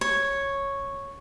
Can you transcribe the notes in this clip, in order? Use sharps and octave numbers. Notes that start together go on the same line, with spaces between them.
C#5